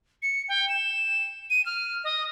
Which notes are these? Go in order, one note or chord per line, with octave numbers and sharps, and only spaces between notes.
C#7
G5
E7
D#7
F6
D#5